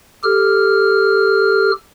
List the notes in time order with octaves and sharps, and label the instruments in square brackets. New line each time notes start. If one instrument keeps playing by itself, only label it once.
[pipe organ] G4 A4 F6